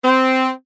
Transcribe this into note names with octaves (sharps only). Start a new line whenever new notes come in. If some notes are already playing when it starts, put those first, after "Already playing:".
C4